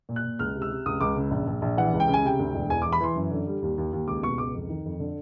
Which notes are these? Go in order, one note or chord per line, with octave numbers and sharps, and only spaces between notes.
A#2
F#6
A#2
C#2 F6
C3
E6
C3
C#2 D#6
C#2 D6
C#3
A#1
A#1
A#1
E3 F#5
C#2
G5
C#3
G#5
C3 G5
D2
E1
E2 G#5
E3 D6
B5
E3 C6
F#2
D3
G3
D#2
D#2
D#2
C#2 D6
B2 C#6
C#2 D6
F2
D#3
F2
D3